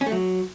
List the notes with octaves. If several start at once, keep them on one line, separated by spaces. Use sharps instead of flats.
C#4
A3
F#3